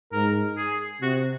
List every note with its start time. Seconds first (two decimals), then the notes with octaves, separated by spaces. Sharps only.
0.12 G#2 A#4
0.58 G#4
1.02 C3 F#4